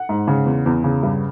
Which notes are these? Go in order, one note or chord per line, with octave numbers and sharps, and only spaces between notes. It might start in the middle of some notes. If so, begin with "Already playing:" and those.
Already playing: F#5
G#2
C#3
E2
E2
C#3
G2